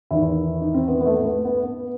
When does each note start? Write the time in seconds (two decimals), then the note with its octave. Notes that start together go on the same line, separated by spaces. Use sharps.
0.11 E2 D#3 E4
0.61 D#4
0.74 C4
0.87 B3
1.01 B3
1.06 A3
1.17 A3
1.25 B3
1.45 B3
1.63 B3